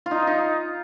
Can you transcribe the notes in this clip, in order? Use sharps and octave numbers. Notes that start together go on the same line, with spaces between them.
F4
D#4
D#4